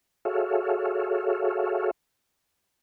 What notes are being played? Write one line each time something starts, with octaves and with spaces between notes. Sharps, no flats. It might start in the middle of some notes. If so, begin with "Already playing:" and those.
F#4 G#4 A4 C#5 E5 F5